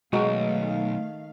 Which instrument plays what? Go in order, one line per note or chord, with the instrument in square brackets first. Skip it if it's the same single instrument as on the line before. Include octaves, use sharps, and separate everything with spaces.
[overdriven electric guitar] B1 [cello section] D#3 A3 F5 [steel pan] G#3 F#4 [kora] D#4